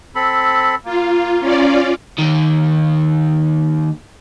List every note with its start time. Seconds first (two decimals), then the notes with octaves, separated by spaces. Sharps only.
0.15 C4 A4 B5
0.85 A#3 F4
1.40 C#4 F4 D5
2.19 D#2 D#3